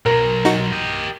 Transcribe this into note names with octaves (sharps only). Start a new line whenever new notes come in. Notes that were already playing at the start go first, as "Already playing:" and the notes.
B1 F#3 A#4
D#4 F#4
G4 D#5